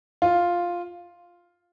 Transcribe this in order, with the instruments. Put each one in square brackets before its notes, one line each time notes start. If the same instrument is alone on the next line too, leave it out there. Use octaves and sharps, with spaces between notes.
[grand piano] F4